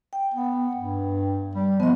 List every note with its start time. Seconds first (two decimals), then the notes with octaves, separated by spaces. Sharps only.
0.13 G5
0.34 B3
0.76 G2
1.55 G3
1.80 F3 B3 D#5